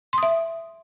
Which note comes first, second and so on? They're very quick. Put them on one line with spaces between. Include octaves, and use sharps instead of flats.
C6 D#6 E5